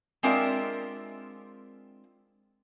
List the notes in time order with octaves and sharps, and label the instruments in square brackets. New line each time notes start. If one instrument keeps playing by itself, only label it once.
[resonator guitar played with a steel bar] G#3 C4 D4 F4 A#4 E5